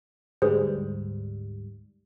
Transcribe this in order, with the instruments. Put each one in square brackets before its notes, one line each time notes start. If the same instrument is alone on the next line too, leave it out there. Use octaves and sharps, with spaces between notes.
[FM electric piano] D2 G#2 G3 [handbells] G#4 B4 C5